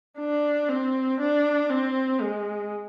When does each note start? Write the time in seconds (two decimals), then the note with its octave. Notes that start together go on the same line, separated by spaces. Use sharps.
0.18 D4
0.69 C4
1.20 D4
1.70 C4
2.20 G#3